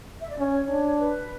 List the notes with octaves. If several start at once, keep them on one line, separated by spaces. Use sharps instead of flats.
E5
D5
C#4 C#5
D4
B4